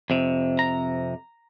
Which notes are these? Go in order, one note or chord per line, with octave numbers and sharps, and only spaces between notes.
F2 C3
A#5